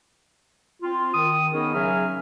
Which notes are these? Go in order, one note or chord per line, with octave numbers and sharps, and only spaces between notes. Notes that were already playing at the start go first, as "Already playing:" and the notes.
C4 F4
D#3 D#6
B3 C#4 D#4 G#4 A#4
C#3 F#3 C#4 G#4 E5 F6